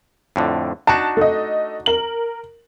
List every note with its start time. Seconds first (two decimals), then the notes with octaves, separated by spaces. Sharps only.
0.36 F2 A2 D3
0.87 D4 D#4 F#4 A5
1.17 A3 D#5
1.86 A#4 F#7